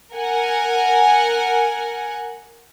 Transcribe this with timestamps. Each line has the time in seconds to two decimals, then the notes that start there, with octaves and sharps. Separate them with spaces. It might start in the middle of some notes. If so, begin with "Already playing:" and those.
0.14 A#4 F#5 G#5